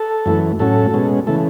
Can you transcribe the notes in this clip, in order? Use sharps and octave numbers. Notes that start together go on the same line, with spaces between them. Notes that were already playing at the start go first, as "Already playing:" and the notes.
Already playing: A4
F#2 E3 A3
A2 F#3 C#4 A4
B2 G#3 C#4
C#3 E3 A3 A4